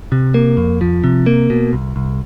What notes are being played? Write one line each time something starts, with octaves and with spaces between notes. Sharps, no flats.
C3
A#3
F2
F3
C3
A#3
B2
C2
C2